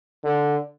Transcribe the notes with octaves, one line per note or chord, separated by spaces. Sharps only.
D3